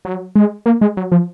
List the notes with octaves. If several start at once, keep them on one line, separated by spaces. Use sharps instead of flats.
F#3
G#3
A#3
G#3
F#3
F3